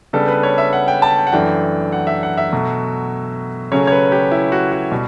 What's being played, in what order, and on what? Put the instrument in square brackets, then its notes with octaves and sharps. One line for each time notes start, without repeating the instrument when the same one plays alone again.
[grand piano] C#3 G3 B3 D4 A4
B4
C#5
E5
F#5
G5
A5
G5
F#5
F#2 E3 A3 D4 G5
F#5
E5
F#5
E5
B2 F#3 A3
C#3 F#3 A3 C#4 C#5
C#5
B4
G4
E4
F#4
F#4
B2 G3